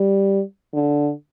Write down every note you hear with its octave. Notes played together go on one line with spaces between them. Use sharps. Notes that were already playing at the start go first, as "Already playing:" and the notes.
Already playing: G3
D3